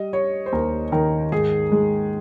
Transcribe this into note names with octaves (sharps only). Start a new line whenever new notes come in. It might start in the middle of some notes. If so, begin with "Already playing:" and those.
Already playing: G3 D#5
G3 C#5
C5
D#2 A#4
D#3 A#4
G#2 G#4
G#3